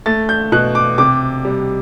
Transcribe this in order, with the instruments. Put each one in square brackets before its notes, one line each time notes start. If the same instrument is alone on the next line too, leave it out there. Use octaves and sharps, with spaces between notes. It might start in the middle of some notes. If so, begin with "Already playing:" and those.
[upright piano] A3 A6
G6
B2 F#6
D6
C3 D6
G3